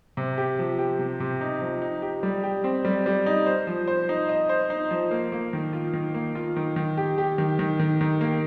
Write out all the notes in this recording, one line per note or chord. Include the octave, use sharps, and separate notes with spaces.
C3
G4
F3
G4
C3
C3
D#4
F3
D#4
G4
G3
G4
C4
G3
G3
D#4
C5
F3
C5
D#4
D#5
C5
D#4
F3
A#3
A#3
D#3
F4
D#3
A#3
F4
D#3
D#3
G4
G4
D#3
D#3
D#3
D#3
A#3